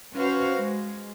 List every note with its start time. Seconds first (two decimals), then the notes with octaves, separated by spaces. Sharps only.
0.14 C#4 F#4 B4 C5 F5
0.57 G#3